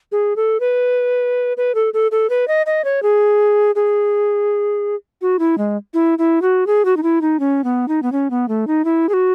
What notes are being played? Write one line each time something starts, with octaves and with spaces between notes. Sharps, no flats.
G#4
A4
B4
B4
A4
A4
A4
B4
D#5
D#5
C#5
G#4
G#4
F#4
E4
G#3
E4
E4
F#4
G#4
F#4
D#4
E4
D#4
C#4
B3
D#4
B3
C#4
B3
A3
D#4
E4
G#4
F#4